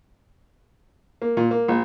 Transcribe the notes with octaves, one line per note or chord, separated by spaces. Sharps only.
A#3
A#2
A#3
A#1